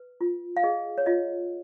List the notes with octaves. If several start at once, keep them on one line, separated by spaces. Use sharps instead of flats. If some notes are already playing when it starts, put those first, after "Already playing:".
Already playing: B4
F4
F5
G#4 D#5
C#5
F4 D#5